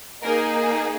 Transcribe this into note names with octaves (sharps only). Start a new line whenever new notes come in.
A#3 D#4 G#4 A#4